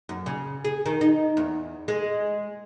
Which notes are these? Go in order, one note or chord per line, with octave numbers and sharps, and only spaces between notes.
F#2
C#3
G#4
D#3
D#4
E2
G#3